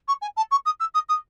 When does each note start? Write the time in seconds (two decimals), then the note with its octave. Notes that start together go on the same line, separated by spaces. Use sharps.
0.08 C#6
0.22 G#5
0.37 A5
0.51 C#6
0.66 D#6
0.80 E6
0.94 D#6
1.09 D#6